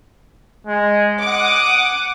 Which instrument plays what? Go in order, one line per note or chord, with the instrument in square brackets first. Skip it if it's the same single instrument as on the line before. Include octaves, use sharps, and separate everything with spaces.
[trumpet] G#3
[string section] F#5 D6 [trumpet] D#6